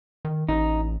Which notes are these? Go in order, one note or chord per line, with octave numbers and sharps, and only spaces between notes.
D#3
A1 D#4